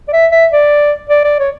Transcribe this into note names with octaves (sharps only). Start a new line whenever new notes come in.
D5
E5
E5
D5
D5
D5
C#5